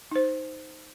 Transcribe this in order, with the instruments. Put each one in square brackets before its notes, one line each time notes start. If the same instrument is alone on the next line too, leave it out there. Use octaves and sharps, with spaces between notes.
[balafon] D#4 C5